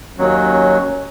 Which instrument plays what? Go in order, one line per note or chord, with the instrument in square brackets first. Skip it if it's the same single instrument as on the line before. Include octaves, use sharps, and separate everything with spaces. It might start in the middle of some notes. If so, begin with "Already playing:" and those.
[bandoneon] D#2 F#3 [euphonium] C#4